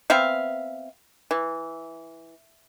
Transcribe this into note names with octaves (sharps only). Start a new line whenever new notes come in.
B3 C4 E5 F5
E3